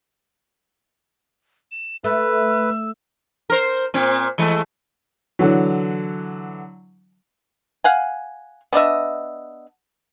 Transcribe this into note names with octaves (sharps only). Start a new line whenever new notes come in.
E7
A3 B4 E6
A#4 C5
A#2 C4
E3 G#3 A3
D3 E3 F#3
F5 F#5 G#5
B3 D4 D#5 E5